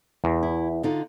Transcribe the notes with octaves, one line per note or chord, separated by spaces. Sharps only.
E2
E4
D3 D#4 F4